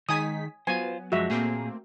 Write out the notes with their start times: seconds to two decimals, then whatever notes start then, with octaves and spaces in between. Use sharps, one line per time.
0.09 D#3 G#3 D#4 G#5 D#6 B6
0.67 F#3 B3 F4 C5 G#5
1.12 F#2 F3 G#3 F#4 E5
1.30 A#2 A3 A#3 C4 G#4